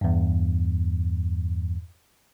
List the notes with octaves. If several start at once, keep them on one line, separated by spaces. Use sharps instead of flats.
E2 G2